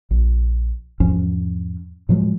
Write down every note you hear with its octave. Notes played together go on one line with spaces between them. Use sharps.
A#1
E2 G#2 F3 C#4
A2 F3 F#3 G#3